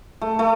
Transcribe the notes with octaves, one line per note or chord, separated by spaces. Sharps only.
A3
A3